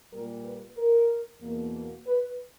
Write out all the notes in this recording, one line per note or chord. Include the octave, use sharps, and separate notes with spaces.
A#2 G3 A#3 A#4
B4
A#4
E2 B2 A#3
B4